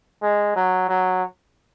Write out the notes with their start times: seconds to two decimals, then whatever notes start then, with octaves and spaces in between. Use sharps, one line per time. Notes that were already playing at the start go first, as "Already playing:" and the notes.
0.22 G#3
0.56 F#3
0.89 F#3